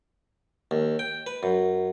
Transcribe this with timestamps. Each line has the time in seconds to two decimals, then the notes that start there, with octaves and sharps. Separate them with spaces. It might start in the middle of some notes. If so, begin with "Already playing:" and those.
0.71 D#2
0.99 G5
1.27 B4
1.43 F#2